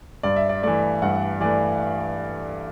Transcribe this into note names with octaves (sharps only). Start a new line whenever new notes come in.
G2 D5
E5
D5
E3 A3 D5
G2 F#5
E3 A3 D5